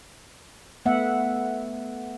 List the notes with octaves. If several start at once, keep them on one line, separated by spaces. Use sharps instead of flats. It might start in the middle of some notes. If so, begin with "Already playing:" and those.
A3 B3 E5 F#5